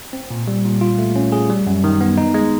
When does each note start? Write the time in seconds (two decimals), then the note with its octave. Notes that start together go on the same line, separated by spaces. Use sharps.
0.13 C4
0.31 A#2
0.48 G3
0.64 A#2
0.81 F4
0.98 A3
1.16 C#4
1.32 G#4
1.50 G3
1.67 F#2
1.84 D#3
2.01 B3
2.18 D#4
2.34 G#3